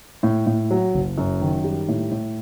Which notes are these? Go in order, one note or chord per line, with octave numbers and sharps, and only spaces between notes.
A2
A2
F#3
F#1
F#2
D#3
G3
A2
A2